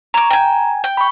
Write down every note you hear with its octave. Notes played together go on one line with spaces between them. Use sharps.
C#5 A#5 D6
G5 G#5
G5
B5 C#6